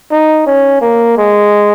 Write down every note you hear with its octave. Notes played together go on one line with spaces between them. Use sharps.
D#4
C#4
A#3
G#3